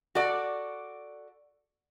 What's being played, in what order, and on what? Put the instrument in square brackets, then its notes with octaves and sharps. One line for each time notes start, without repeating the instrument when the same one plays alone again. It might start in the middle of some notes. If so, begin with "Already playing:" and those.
[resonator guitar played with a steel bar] F#4 A4 D5